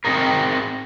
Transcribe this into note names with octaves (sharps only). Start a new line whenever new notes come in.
C4 D#4 F#4 G#4 A#4